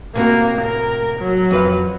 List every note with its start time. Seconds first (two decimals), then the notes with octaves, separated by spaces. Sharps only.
0.15 A2 C3 A#3 F#4
0.61 A#4
1.20 F#3
1.51 F2 B4 F5